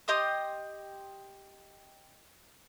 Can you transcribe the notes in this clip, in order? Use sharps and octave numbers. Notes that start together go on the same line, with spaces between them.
G4 D#5 C6 D#6